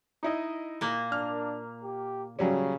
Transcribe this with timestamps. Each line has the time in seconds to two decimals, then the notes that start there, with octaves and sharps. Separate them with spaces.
0.23 D#4 E4 D#5
0.81 A#2 A#3
1.12 D4 F6
1.83 G4
2.39 C#3 F#3 G3 C#4